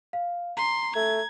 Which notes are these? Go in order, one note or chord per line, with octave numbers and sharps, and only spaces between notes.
F5
A#5 C6
A3 G#6